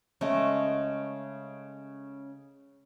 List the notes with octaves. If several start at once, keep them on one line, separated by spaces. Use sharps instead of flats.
C#3 G#3 A3